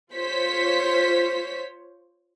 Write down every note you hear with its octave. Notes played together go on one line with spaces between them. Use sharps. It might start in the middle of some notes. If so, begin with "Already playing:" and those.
F4 C5 C#5 B6